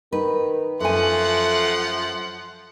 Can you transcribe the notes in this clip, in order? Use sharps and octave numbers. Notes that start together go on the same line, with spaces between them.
D#3 B4
F#2 F3 A3 F#5 G#5 C6